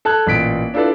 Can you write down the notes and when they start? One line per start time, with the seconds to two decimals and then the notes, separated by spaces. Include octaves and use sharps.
0.05 A4 A5 F#6 G#6
0.27 A1 A#2 B6 D7
0.74 D4 E4 F4 A4 B4 D5